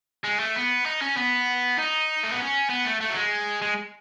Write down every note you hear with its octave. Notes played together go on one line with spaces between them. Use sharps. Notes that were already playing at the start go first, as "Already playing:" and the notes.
G#3
A3
B3
D#4
C#4
B3
D#4
A3
B3
C#4
B3
A3
A3
F#3
G#3
G#3